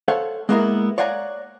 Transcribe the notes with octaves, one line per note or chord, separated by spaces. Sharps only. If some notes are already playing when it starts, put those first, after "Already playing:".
A4 C5 C#5 F5 F#5
G#3 A#3 B3 E4 G#4 A#4
C#5 D5 F5 F#5 G#5 A#5